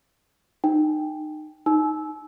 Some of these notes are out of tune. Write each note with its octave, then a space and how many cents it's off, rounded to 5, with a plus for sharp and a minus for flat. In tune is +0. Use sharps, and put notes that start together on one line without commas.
D#4 -25 G5 +0
D#4 +0 G#5 +45 E6 -10